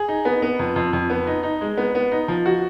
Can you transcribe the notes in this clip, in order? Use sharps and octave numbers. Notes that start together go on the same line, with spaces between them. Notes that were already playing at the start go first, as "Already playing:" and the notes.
Already playing: G#4
D#4
B3
B3
F2
F2
F2
B3
D#4
D#4
G#3
B3
B3
D#4
F3
F#4